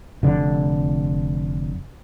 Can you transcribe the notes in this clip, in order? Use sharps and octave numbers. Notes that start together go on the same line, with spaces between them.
F1 D3